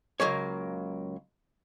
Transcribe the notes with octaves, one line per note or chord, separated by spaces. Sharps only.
C#2 F#3 A#3 C#5